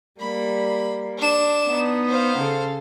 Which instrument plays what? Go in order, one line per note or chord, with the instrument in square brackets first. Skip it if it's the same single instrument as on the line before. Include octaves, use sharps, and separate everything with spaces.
[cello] G3 A#3 [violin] B5
[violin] D4 E7
[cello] B3 D#4
[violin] C5 F5
[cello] C#3 A4